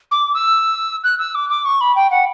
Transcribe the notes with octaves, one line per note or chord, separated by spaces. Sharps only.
D6
E6
F#6
E6
D6
D6
C#6
B5
G5
F#5